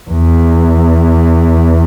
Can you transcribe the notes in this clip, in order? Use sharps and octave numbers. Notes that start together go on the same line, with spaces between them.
E2